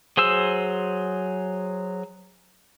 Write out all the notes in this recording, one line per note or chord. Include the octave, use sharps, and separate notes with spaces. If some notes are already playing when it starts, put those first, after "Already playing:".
F#3 G#4 C5 E6